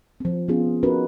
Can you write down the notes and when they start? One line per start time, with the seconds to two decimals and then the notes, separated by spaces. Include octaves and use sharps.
0.20 F3 C4
0.48 F3 B3 C#4 F4 G#4
0.83 C#4 D#4 F#4 A#4 B4